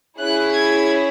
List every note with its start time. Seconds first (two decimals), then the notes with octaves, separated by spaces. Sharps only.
0.18 C#4 E4 G#4 F#6
0.52 G#6